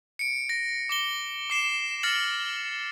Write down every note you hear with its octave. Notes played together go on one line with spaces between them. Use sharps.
C#7 D7
A#6
D6 A#6 G7
D6 C7 E7
F6 A6 A#6 C#7 F#7